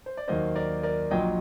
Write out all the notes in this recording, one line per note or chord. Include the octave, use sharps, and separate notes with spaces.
C5
D5
D#2 D#3 F#3 A#3 C5 D#5
A#4 D5
A#4 D5
A#1 A#2 F#3 D#5 G5